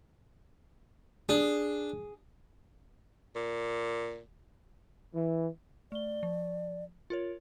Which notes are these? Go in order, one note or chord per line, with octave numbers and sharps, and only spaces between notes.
D4 G#4
A#2
E3
A3 D5 G7
F3
F4 A#4 C#5